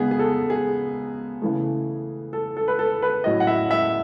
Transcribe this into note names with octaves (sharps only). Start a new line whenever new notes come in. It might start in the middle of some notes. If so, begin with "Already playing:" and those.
Already playing: C#3 G#3 B3 D#4 G#4
G#4
A4
G#4
C#3 E3 A3
A4
A4
B4
A4
B4
A2 F#3 C#4 D#5
F#5
E5
E5